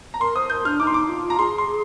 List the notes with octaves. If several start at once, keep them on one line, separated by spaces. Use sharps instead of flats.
A#5
A#4 C6
C5 D#6
A#4 G6
D4 F6
D#4 D6
C6
D6
F4
A#5
G#4 C6
C6